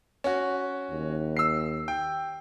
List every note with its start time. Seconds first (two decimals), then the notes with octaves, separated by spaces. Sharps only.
0.24 C#4 F#4
0.91 D#2
1.37 E6 C7
1.88 G5